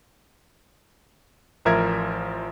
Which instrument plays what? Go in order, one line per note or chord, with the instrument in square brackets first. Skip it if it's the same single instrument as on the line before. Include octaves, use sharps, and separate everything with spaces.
[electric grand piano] A1 F3 A#4 E5 G#6